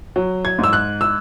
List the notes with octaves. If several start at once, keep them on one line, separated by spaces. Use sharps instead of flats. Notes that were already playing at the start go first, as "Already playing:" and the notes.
F#3
G#6
G#2 E6
F#6
E6